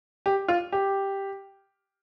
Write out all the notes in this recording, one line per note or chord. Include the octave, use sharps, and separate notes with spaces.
G4
F4
G4